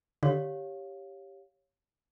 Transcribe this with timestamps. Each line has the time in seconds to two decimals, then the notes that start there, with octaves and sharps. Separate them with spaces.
0.23 D3 G4 C#5 F5